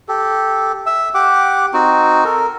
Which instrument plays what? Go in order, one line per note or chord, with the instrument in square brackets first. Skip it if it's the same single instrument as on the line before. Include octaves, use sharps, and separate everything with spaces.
[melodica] G4 A4
E5 E6
G4 F#5 D6
C4 D#4 F#4
A4 A#4